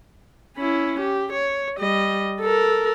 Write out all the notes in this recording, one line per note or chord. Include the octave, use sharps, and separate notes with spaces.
C#4 E4
G4
C#5
G3 D#5
A4 A#4